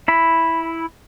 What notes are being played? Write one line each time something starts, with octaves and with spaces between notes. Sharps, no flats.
E4 B5